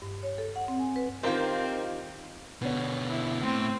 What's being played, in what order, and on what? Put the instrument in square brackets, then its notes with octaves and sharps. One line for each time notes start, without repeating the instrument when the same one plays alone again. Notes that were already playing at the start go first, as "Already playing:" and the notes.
[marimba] G2
C#5
A4
F#5
C4
G#5
B4
[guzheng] D#3 G4 [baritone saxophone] C4 [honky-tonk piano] F4 A#4 C5
[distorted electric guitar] B2 D3 [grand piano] B3 C#5
[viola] E4
[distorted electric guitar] A2 [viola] C4